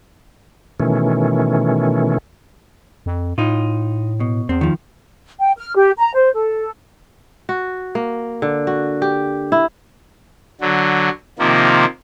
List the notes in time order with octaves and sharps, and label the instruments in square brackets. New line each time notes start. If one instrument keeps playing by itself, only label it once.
[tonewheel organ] B2 D#3 E3 A3 C#4
[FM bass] F2
[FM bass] A2 [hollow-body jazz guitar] D#4 F4
[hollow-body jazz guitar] B2
[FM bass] E2 [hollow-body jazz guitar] C4
[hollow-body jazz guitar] D#3 F3
[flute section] G5
F6
G4
A#5
C5
A4
[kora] F#4
A#3
D3
F#4
G4
E4
[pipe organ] D3 F#3
C3 D#3 F3 A#3